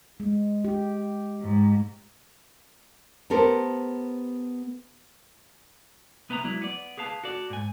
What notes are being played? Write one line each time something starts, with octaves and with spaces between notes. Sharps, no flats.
G#3
G4
G#2
B3 G4 A4 A#4 C5
C2 B3 B4 E5 G5 A#5
F#3 G#3 E4 D5
B3 D5
G#4 B4 F5 A5
F#4 A4 D5
G#2 G#5